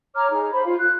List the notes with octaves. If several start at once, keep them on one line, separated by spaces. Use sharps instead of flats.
C#5 A#5 D6 F6
D#4 G#4
C5 B5
F4 F5
F#6